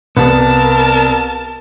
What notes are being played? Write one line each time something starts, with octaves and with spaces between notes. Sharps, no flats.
C2 B3 A#4 A5